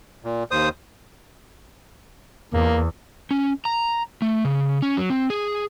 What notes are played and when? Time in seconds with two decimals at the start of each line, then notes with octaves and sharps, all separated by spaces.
0.24 A#2
0.51 D#2 C5 D#6
2.53 E2 A#3
3.31 C#4
3.65 A#5
4.22 A3
4.45 C#3
4.82 C#4
4.97 F#3
5.10 C4
5.30 G#4